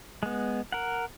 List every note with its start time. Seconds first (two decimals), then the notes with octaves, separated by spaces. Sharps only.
0.23 G#3 B3
0.72 A#4 F#5